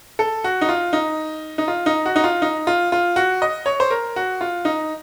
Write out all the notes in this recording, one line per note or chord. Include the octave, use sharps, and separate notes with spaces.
A4
F#4
D#4
F4
D#4
D#4
F4
D#4
F#4
D#4
F4
D#4
F4
F4
F#4
D#5
C#5
C5
A#4
F#4
F4
D#4